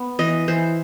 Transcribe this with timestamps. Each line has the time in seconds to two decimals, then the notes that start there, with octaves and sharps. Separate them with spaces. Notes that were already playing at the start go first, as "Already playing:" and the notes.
Already playing: B3
0.19 E3 D#5
0.48 E3 C5